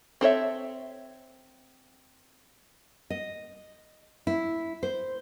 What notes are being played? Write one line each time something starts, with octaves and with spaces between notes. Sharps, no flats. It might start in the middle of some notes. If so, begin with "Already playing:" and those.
C4 A4 C#5 E5
D#5
E4
C5